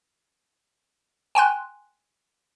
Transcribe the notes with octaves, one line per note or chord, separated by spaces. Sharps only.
G5 G#5 C6 F#6